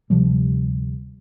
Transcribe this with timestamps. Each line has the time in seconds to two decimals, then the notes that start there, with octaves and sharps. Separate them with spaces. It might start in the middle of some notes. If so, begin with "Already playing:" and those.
0.10 D2 C3 F3 G3